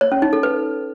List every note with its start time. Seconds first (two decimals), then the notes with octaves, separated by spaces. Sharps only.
0.01 C#5
0.12 C#4
0.22 D#4
0.33 A4
0.43 B4